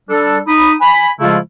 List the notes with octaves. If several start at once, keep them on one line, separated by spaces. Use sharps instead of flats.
G3 D4 A4
D#4 B5 D#6
G#5 B5
C#3 F3 G#3 A3 E4 F4